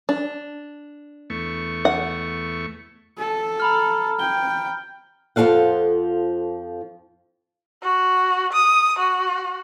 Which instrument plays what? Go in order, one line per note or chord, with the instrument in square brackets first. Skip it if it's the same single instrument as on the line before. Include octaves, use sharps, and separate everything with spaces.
[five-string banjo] D4
[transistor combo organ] E2 A3 C#6
[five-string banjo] F#5
[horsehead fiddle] A4
[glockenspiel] A#5 B5 F6
[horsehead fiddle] G5 [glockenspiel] G7
[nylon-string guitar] F2 F3 G4 A4 F5 F#5
[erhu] F#4
D#6
F#4